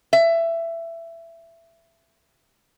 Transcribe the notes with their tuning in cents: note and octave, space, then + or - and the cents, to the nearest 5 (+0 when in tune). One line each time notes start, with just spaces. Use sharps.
E5 +15